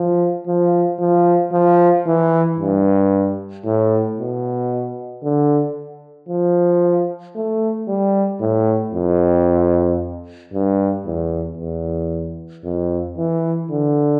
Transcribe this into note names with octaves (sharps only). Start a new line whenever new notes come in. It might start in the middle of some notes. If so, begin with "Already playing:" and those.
Already playing: F3
F3
F3
F3
E3
G2
A2
B2
D3
F3
A3
G3
A2
F2
G2
E2
E2
F2
E3
D3